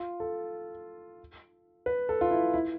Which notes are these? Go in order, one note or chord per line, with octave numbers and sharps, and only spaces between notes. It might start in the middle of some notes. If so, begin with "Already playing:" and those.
Already playing: F4
A4
B4
A4
F4
E4
E4